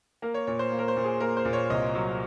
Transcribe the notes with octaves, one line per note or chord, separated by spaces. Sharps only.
A#3 A#4
C#5
A#2 C#5
C5
A#3
A#4
C5
A#2
G#4
A#3 A#4
C5
A#2
C#5
C2 D#5
F#3